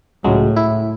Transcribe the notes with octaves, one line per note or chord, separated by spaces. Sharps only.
C#2 A2 F#3 G#3
E4